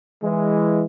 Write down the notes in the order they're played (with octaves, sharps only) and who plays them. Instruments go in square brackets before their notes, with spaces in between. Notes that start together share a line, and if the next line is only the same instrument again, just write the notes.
[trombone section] E3 G#3